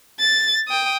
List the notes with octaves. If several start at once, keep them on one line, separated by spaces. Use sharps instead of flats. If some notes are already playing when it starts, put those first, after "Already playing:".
A6
G5 D#6